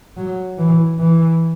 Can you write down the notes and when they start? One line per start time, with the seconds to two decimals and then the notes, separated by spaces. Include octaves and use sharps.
0.17 F#3
0.58 E3
0.99 E3